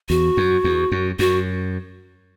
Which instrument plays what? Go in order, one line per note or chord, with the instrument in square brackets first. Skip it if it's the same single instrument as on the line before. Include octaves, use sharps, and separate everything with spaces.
[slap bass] E2 [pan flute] F#4
[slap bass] F#2
E2
F#2
[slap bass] F#2 [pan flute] F#4